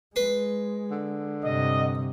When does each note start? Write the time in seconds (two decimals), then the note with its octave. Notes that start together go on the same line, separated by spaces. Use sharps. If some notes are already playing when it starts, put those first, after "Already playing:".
0.16 G#3 B4 C6
0.91 D3
1.44 G2 C3 D#5